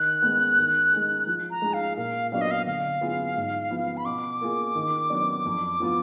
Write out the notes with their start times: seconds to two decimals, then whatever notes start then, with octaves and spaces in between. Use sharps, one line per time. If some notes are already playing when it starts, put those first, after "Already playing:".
Already playing: D#3 F#6
0.22 G#3 B3
0.58 D#3
0.92 G#3 D#4 G#4
1.27 F3
1.50 A#5
1.62 G#3 D#4 G#4
1.74 F5
1.97 A#2 F5
2.31 F#3 B3 D4 F#4 F5
2.41 D#5
2.51 F5
2.66 D3 F5
3.01 F#3 B3 F4 G#4
3.37 G#2
3.70 F3 B3
3.97 B5
4.05 B2 D6
4.41 A#3 F4 G#4
4.75 D#3
5.10 F#3 B3 D4
5.45 F2
5.80 F3 B3 F4